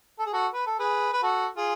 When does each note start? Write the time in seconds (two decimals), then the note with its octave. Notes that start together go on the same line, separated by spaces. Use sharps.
0.19 A4
0.26 G#4
0.33 F#4 A4
0.54 B4
0.67 A4
0.79 G#4 B4
1.13 B4
1.23 F#4 A4
1.57 F4 G#4